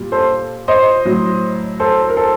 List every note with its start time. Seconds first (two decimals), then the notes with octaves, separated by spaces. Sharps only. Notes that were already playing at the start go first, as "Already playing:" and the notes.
Already playing: A#2 G3
0.12 A4 C5
0.68 C5 D#5
1.05 A2 F#3
1.80 A4 C5
2.09 A#4
2.17 A4 C5